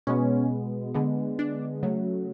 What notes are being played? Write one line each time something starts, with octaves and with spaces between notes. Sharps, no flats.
B2 G#3 B3 C#4
D3 G#3 B3
D4
C#3 F#3 A3